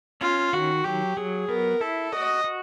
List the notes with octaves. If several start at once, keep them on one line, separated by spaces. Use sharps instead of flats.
C#4 F4
D#3 F#4
F#3 G4
F#3 G#4
B3 A#4
E4 A4
F#4 D#5
F#4